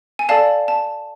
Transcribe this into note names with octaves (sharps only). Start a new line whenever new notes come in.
G#5
A4 D5 F5 A5
A5